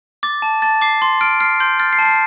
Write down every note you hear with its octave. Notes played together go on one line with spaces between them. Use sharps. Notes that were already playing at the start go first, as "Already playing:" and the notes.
D6 A6
A5
A5 A6
D6 C7
C6
F6 D7
F6 C7
C6 G6
F6 A6
C7
A5
C7